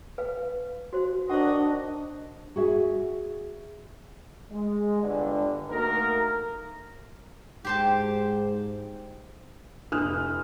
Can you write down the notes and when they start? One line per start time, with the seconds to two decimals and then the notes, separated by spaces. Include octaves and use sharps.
0.18 B4 F5
0.93 F#4 C5
1.30 D#3 D4 F#4 C5 D#5 F#5
2.56 F#4 G#4 E5
4.51 G#3
5.01 G1 G2 D3
5.70 A3 A#3 D#4 F#4 A#4
7.65 G#2 G4 C5 A5
9.92 F1 D4 E4 B4 D#6 F6 F#6